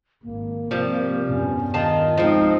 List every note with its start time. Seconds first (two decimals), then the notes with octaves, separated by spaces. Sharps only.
0.24 G#1 A#3
0.71 C3 F3 G3
1.29 E2 G2 C#4
1.74 D#3 F4 D#5 A5
2.18 F3 G#3 A#3 C4 D#4